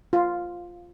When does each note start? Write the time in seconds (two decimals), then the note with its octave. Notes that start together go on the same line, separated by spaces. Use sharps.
0.13 F4